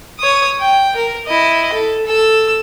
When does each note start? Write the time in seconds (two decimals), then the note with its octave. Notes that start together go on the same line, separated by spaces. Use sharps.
0.19 C#5 D#6
0.59 G5
0.96 A#4
1.27 E4 D#5
1.72 A4
2.06 A4 E6